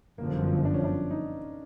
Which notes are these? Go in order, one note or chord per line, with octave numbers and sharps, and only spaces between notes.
G1 F#2 D3 F3 A#3
D4
C#4
D4
D#4